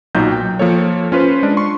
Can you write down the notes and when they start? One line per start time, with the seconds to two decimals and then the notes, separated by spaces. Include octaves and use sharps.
0.15 B1 A#2 F#3 D#4 G6
0.32 G5
0.59 F3 A#3 A4 C#5
1.12 C#4 F4 B4 C5
1.43 G#3 D4
1.57 C6 C#6